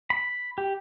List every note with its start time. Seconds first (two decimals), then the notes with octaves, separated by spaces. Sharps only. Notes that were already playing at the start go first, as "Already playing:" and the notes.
0.10 B5
0.58 G4